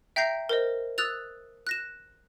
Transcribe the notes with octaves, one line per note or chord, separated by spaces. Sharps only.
E5 G5 A#5 G6 A#6 C7
A#4 C5 D#5
D#6 E6 F#6 A6 F7
F#6 A#6 E7